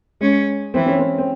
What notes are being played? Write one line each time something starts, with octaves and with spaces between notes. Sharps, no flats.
G#3 C#4
E3 C4
C#4
C4
C4